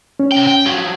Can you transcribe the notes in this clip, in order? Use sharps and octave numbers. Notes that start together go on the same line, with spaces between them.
C#4
C3 G5
G5
F3 F#3